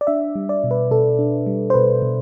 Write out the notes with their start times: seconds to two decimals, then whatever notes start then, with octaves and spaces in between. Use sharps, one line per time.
0.01 D5
0.07 D4 E5
0.35 G3
0.49 D5
0.64 B2
0.71 B4
0.91 B2 A4
1.19 D4
1.47 G3
1.70 C5
1.74 B2 B4
2.02 B2